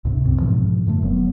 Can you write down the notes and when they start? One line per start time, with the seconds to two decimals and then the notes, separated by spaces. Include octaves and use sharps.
0.05 D2 G#2 C3
0.24 C2 F#2 C4
0.40 G#2 B2 E3 F3
0.86 F#2 D3 A3
1.03 F1 F#3 B3